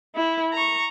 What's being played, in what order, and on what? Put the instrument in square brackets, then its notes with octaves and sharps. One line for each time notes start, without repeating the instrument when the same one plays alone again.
[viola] E4
A#5 C#6